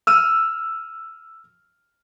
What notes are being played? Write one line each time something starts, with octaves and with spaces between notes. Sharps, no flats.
E6 F6 D#7